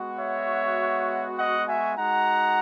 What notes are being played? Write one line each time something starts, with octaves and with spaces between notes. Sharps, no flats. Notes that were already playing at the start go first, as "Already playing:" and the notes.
Already playing: G#3 B3 F#4
C#5 E5
D#5 F#5
E5 G#5
G#3 D#4 F#4 F#5 A#5